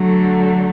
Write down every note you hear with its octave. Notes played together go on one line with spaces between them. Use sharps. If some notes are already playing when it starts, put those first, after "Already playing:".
Already playing: D3 F#3 A3